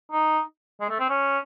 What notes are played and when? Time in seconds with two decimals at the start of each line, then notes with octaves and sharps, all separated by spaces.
0.12 D#4
0.81 G#3
0.90 A3
1.00 C4
1.09 C#4